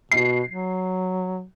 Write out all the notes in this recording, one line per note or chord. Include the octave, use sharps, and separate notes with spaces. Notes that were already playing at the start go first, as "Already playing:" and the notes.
B2 C7
F#3